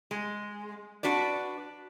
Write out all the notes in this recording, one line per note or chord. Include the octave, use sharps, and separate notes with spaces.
G#3
D4 F#4 B4 D5